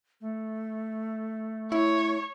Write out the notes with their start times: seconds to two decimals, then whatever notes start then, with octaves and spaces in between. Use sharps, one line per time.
0.21 A3
1.72 E4 C#5